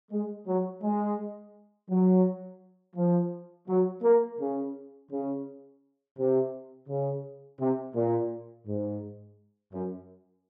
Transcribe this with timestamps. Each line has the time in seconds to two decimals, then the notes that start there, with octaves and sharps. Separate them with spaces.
0.11 G#3
0.47 F#3
0.83 G#3
1.89 F#3
2.96 F3
3.68 F#3
4.02 A#3
4.39 C#3
5.10 C#3
6.17 C3
6.88 C#3
7.59 C3
7.94 A#2
8.67 G#2
9.73 F#2